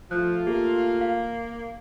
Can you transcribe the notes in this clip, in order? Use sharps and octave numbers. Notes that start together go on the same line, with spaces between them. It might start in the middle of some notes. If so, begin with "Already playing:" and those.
F3 A3 F4 F#6
A#3 G4
F5